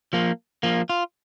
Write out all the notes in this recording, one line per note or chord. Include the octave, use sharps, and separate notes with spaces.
F3 A#3
F3 A#3
F4